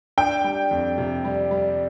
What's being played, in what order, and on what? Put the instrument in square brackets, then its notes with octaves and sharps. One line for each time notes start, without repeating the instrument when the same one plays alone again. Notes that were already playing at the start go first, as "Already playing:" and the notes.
[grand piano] D4 [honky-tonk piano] G5
[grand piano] G3
F2
C3
G3
G3